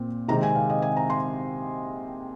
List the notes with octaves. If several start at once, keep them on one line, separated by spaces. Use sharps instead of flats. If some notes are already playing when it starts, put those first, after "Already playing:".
Already playing: A#2 C4
C3 D#3 G#3 C4 A#5
G#5
F5
D#5
G#5
A#5
C6